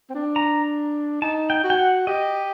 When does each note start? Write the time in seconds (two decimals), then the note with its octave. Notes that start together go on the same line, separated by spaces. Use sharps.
0.10 C4
0.14 D4
0.36 A#5
1.22 D#4 A5
1.50 G5
1.64 F#4
1.70 G5
1.79 F#5
2.07 G4 D#5